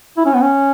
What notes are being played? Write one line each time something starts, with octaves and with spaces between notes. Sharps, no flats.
E4
C#4
B3
C#4